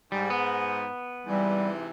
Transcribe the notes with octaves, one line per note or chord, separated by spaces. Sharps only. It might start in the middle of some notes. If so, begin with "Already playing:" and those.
G#2 G3
B3
G#2 C3 E3 G3